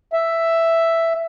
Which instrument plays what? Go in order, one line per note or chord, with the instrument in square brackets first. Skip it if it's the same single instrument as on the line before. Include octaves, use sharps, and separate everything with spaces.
[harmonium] E5